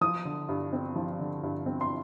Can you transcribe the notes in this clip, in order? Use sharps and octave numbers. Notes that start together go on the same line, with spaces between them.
F3 D#6
D3
G2
C4
F3
D3
G2
C4
C6